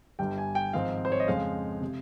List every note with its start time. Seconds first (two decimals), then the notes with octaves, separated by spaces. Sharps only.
0.19 G1 G2 G3 G5
0.38 G#5
0.55 G5
0.73 G#1 G#2 F3 C4 F5
1.05 C5
1.12 C#5
1.20 D#5
1.28 F2 C#3 G#3 F5
1.81 C3